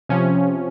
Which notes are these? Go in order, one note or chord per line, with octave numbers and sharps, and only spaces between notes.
C3 F3 C#4